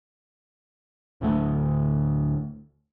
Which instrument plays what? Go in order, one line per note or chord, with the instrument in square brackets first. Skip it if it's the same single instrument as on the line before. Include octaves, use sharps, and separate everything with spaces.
[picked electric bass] D1 D2 D3 A3